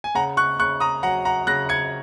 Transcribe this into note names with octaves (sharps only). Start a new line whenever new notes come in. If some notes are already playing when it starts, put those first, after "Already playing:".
G#5
C#3 F#5 A#5
C#6 F#6
C#3 C#6 F#6
A#5 D#6
F#3 F#5 A#5
F#5 A#5
C#3 F#6 A#6
G#6 C#7